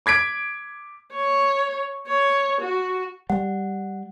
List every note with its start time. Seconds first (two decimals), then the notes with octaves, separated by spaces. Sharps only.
0.06 D6 G#6 B6 D7
1.14 C#5
2.07 C#5
2.61 F#4
3.30 G3 F#5